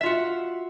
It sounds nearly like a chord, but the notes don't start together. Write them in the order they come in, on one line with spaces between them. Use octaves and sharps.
E5 F4 F#4